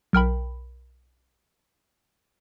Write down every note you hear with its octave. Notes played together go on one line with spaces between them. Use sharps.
B1 A#4 G5 B5